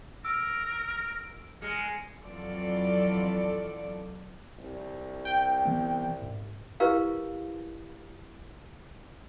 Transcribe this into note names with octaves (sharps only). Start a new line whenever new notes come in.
A#4 E6 D7
G#3 A#4 C#7
F2 E3 F#3 F4 A4 D5
C2
G5
E3 B3 C4
G#2
E4 G4 A#4 B4 F5